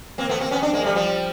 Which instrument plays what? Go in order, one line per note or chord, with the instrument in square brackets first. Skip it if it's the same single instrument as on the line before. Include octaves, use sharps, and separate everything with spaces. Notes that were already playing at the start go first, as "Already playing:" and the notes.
[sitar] A#3 C4
A3 B3
A#3 C4
B3 C#4
C4 D4
G#3 A#3
G3 A3
F3 G3